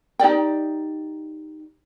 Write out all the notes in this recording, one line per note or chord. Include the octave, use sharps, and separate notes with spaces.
D#4 G4 D5 G5